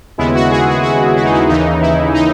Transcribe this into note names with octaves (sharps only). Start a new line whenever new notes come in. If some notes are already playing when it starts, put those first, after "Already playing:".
D#2 C#3 G#3 B3 E4
F#4
G#4
F#4
F#4
E4
D#4
E4
D#2 C#3 E3 D#4
E4
D#4